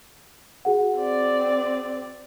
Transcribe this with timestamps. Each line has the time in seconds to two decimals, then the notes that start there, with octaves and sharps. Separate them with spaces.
0.65 F#4 G#4 F#5
0.98 C4 D5